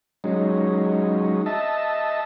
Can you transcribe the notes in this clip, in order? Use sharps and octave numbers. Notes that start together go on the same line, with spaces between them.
F#3 G#3 C#4 D#4
D#5 E5 A5